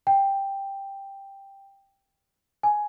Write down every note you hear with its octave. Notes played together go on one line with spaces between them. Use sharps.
G5
G#5